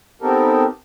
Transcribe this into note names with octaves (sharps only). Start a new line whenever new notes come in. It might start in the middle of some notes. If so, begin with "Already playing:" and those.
B3 C4 D#4 G4 A4 A#4